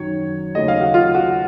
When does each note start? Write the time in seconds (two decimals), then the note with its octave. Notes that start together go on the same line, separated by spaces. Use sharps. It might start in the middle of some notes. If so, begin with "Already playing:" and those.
Already playing: F#2 D#3 F#3 C#5
0.55 D#2 C#3 F#3 A3 D#5
0.68 F5
0.81 F#4
0.94 F4
1.15 F#4